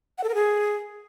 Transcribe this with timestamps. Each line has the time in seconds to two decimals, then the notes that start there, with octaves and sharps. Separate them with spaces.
0.18 F#5
0.24 A4
0.29 A#4
0.35 G#4